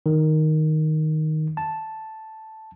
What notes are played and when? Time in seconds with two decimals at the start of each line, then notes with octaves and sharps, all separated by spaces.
0.06 D#3
1.57 A5